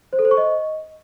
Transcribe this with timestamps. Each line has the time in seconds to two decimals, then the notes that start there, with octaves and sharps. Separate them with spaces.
0.13 C5
0.19 A4
0.25 C5
0.31 C#6
0.37 D#5